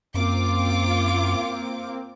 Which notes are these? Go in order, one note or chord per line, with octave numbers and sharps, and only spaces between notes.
F#2 A#3 C4 F4 D6